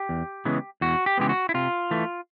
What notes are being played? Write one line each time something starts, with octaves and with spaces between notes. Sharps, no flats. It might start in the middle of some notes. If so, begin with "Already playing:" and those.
Already playing: G4
E2
C#3 E3 G#3 B3
E2 F#4
G4
C#3 E3 G#3 B3 G4
F#4
E4
C3 F4
E3 A3